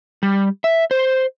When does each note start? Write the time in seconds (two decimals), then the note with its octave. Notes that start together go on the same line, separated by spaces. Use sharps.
0.23 G3
0.64 E5
0.91 C5